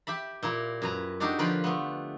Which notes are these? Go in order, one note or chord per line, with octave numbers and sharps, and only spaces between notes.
G4 E5 B5
A#2 E4 A#4
F#2 B4 A#5
D4 D#4 F#4 G4 A4
D3 F3 F4 A#4 B4 B5
A3 B3